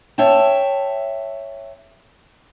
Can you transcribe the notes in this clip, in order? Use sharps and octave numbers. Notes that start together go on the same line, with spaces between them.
C#5 E5 G5 A5